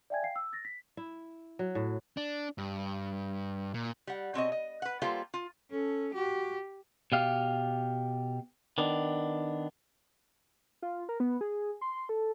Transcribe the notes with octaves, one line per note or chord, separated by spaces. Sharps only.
D5 E5 G5 G#5 G#6
F5 G5 C7
E6
A6 A#6
B6
E4
F#3
A2
D4
G2
A#2
G3 F#5
B2 C4 C#5 D#5
D#5
B4 F#5
G3 A#3 F4 A4 C5 G5
F4
C#4 A4
F#4 G4
B2 G4 F5
D#3 B3 D4
F4
A#4
B3
G#4
C6
A4